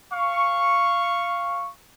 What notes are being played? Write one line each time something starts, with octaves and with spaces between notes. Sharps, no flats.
F5 C#6